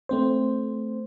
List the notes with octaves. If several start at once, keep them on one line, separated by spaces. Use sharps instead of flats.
A3 C4 C5